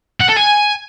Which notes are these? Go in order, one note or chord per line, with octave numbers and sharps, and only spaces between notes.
F#5
A4
G#5